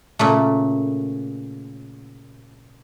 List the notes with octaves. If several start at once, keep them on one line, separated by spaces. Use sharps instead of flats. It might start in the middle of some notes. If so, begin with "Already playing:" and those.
A#2 C#3 A3